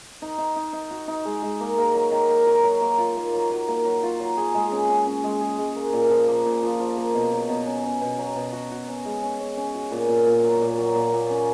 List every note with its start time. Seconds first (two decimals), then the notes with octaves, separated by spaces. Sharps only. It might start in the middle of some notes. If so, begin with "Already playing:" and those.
0.22 D#4
0.38 D#4
0.56 D#4
0.73 D#4
0.91 F#4
1.08 D#4
1.25 G#3
1.42 G#3
1.60 A#3
1.78 A#3
1.94 F#3
2.12 D#3
2.29 A#3
2.47 F#3
2.64 F#3
2.81 A#3
2.98 F4
3.17 A#3
3.33 F#3
3.51 F#3
3.68 A#3
3.85 F#3
4.03 F4
4.20 F#3
4.37 G#4
4.54 G#3
4.72 C#4
4.89 C#4
5.07 C#4
5.24 G#3
5.41 G#4
5.59 G#3
5.76 A#3
5.93 A#2
6.10 F3
6.28 A#3
6.46 A#2
6.63 F3
6.80 F3
6.97 A#3
7.14 B2
7.32 F#3
7.49 B2
7.67 C#4
7.84 C#4
8.01 B2
8.18 F#3
8.36 B2
8.53 F#4
8.71 F#4
8.88 C#4
9.05 G#3
9.22 C#4
9.40 C#4
9.57 C#4
9.75 F#4
9.91 A#2
10.09 A#2
10.27 A#2
10.44 F#3
10.62 A#2
10.78 F#3
10.95 A#2
11.14 A#2
11.30 C#4